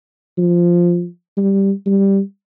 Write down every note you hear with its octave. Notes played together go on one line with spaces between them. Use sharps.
F3
G3
G3